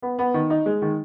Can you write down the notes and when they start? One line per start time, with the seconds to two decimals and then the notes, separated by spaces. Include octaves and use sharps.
0.02 B3
0.19 B3
0.34 D#3
0.50 D#4
0.66 G#3
0.82 D#3